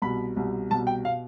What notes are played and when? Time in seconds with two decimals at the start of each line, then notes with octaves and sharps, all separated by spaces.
0.02 C2 B2 B5
0.36 C2 B2
0.70 C2 B2 A5
0.87 G5
1.05 B2 F5